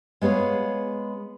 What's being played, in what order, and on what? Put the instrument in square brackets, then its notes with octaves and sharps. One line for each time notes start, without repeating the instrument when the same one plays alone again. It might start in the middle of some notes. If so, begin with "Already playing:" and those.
[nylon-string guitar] G#3 B3 G#4 C#5 F5